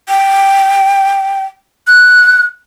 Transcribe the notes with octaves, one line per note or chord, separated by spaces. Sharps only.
G5
F#6